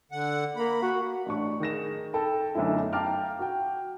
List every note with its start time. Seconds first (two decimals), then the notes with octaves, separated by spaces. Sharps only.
0.12 D3 F#5
0.56 A#3 B5
0.82 F#4
1.26 A1 D4 C#6
1.60 D#3 G#4 A#6 E7
2.13 A4 G5 B5
2.55 B1 F#2 D3 A3 E4
2.93 F5 G5 A5 A#5 D6 F6
3.39 F#4 G5